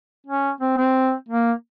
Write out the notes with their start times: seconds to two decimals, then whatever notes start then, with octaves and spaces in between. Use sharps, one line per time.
0.27 C#4
0.61 C4
0.77 C4
1.28 A#3